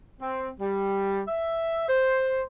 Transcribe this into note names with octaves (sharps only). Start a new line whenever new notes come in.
C4
G3
E5
C5